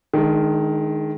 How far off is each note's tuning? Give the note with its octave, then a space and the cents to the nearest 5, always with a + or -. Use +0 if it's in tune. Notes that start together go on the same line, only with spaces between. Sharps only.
D#3 +0 G#3 +30 D4 +15